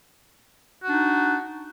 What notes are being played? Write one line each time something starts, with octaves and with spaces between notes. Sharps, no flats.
D4 D#4 F#4